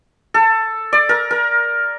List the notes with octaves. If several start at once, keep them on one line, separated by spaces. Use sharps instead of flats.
A4
D5
A#4
A#4